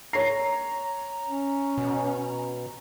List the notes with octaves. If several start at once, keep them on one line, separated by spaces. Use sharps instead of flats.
C#5 A#5 C7
C#4
B2